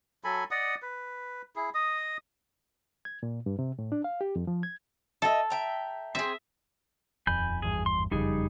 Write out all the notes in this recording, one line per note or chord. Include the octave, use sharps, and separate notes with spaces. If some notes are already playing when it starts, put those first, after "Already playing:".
F#3 A4 G#5 B5
D5 D#5 F#5 D#6
B4
E4 G#4
D#5 D#6
G#6
A#2
G2
C3
A2
D4
F5
G4
F2
F3
G#6
A4 D#5 E5
E5 G5 A#5
C4 G#4 E5
D#1 F2 G#5 B5 G6
G#1 E2 G2 G#4
C6
F#1 F2 C#3 G3 D#4 G#4